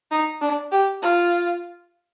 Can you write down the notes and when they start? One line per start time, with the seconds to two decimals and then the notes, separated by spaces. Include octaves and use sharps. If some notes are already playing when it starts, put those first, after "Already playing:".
0.11 D#4
0.41 D4
0.72 G4
1.02 F4